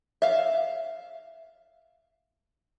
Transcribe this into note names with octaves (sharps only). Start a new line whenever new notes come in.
E5 F5